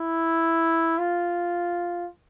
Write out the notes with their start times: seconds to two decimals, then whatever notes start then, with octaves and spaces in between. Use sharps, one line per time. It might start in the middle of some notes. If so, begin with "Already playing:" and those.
Already playing: E4
0.98 F4